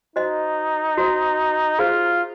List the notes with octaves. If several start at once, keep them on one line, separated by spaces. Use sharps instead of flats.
D#4 F#4 C5 D#5
F#4 C5 D#5
F4 G#4 C5 F5